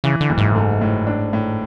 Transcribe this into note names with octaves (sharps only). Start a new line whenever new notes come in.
C#3 E3
D3
F#1
G#2
A2
G#2 A3
A2
D4
A2